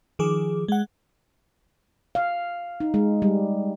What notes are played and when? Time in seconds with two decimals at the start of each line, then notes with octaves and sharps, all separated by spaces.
0.19 D#3 F3 G#4 D6
0.68 G#3 F#5
2.15 F5
2.80 D#4
2.94 G#3
3.22 G3